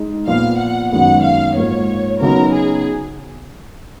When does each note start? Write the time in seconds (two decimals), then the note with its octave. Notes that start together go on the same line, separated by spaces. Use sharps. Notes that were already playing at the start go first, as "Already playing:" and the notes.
Already playing: G#3 D#4
0.27 A#2 F3 B3 F4 F5
0.59 F#5
0.91 F#2 D#3 G#3 B3 F#5
1.24 F5
1.56 G#2 F3 A#3 C#5
2.21 C#3 F#3 B3 D#4 A#4
2.53 G#4